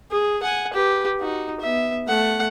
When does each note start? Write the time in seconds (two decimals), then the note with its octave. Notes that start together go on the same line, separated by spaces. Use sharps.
0.11 G#4
0.43 F#5 G#5
0.74 G4 B4
1.20 D#4 F#4
1.60 B3 E5
2.07 A3 F#5